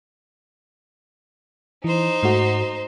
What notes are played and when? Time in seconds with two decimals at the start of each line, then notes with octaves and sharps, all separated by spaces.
1.84 E3 D#4 C5
2.23 G#2 A3 F#4